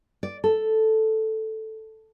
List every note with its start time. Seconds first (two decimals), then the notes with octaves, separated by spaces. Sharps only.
0.23 D5
0.44 A4